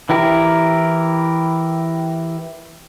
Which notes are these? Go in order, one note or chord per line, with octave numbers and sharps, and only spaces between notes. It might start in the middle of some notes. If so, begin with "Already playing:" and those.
E3 E4 G4 A#4